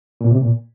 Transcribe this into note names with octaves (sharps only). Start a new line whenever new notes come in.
A#2
C3
A#2